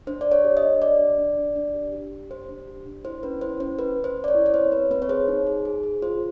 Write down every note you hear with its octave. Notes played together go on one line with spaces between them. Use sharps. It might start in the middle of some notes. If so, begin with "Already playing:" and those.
D4 C5
D4 D5
C#5
G4
D#5
D4
G4 D5
D4
D4
D4
D4
G4
G4
G4
G4 C5
D4
G4
D4
E4 C5
C#4 B4
E4 C5
C#4 C5
C#4 B4
C#4
C5
C#4
D5
C#5
E4
C#5
C4 C5
C4 B4
C4 B4
C#5
G#4 C5
D#4
G#4
G#4
G#4
F4 C5